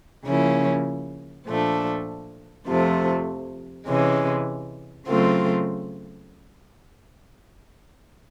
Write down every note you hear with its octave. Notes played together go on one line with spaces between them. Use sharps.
C#3 F3 A#3 C#4 E4
A#2 F3 A3 D4
F2 C3 F3 A3
C3 E3 G#3 C#4
C#3 F#3 A3 C4 F4